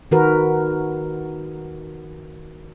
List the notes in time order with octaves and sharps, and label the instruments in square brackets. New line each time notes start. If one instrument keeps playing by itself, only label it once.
[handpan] D#3 F#4 A#4 B4